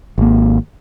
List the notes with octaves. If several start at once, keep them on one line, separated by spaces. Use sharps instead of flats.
G#1 A#3